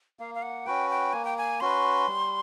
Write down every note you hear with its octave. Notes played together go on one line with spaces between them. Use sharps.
A#3 F5
F5
F#5
C#4 F#4 B4 G5
G5
A#3 G#5
G5
G#5
C#4 F#4 B4 C6
G3